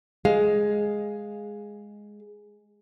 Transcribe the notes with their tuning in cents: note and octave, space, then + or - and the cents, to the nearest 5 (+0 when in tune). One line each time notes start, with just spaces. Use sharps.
G#3 +0 F5 +0